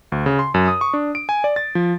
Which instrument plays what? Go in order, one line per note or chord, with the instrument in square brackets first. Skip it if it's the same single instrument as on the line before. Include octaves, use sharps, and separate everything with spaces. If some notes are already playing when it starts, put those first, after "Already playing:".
[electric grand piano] D2
C#3
C6
F#2
D#6
C#6
D4
D7
G#5
D5
A6
F3